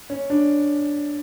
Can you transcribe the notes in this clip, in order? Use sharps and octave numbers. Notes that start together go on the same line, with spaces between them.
C#4
D4